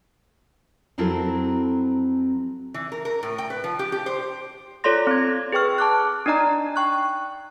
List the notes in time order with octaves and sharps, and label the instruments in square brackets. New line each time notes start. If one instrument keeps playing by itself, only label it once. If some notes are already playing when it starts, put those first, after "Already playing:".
[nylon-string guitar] F2 F#3 C4 E4 A4 A#4
[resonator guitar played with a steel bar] E3
A#4
A#4
A2
G5
B4
F3
G4
G4
C5
[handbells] F4 A4 C#5 D5 C6 A#6
C4 G#6
G#4 B4 G5 C#6 F6
A5 D6 F#6
D4 D#4 D5 D#5 A#5
G5 C#6 F#6